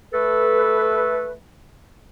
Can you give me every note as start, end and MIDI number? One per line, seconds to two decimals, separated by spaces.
0.13 1.33 57
0.13 1.33 69
0.13 1.33 71